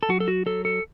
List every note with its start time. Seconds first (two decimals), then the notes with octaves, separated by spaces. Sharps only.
0.03 A4
0.09 F#3 F#4
0.20 A4
0.28 F#4
0.46 F#3 A4
0.65 A4